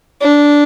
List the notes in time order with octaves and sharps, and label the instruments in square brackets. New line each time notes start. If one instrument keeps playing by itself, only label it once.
[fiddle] D4